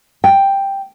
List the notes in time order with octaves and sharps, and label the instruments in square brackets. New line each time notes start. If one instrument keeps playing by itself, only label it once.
[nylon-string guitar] G5